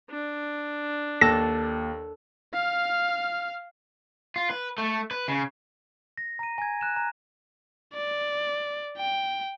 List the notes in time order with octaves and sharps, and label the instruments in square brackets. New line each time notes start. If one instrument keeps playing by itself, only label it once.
[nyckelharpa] D4
[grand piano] D#2 [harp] A4 [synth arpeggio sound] A#6
[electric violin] F5 F6
[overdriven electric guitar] F4
B4
A3
B4
C#3
[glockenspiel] A#6
A#5 D#7
G#5 G#6
F#6 E7
A#5
[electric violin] D5
G5